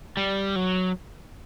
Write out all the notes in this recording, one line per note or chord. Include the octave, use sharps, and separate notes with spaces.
G3
F#3